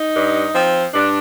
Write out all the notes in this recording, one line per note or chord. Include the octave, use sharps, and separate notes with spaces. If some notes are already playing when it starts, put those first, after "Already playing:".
Already playing: D#4
G2
F3 C4
G2 D4